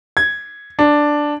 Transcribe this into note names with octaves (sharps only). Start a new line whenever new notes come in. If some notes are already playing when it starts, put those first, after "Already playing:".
G#6
D4